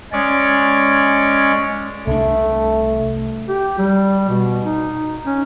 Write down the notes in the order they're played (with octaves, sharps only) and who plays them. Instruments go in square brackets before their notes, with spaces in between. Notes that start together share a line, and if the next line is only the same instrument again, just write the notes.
[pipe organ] G#3 C#4 C#5 D5
[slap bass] C2 D4 [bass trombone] A3
[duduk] G4
G3
B2
D#4
C#4